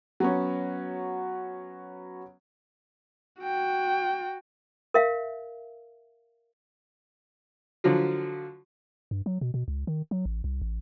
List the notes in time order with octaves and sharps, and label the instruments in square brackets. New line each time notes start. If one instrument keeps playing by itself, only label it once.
[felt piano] F#3 B3 C#4
[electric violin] F#4 G5
[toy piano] A#4 E5 F5
[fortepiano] D3 F3 F#3
[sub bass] G2
F#3
B2
B2
C#2
D#3
F#3
A1
C2
A1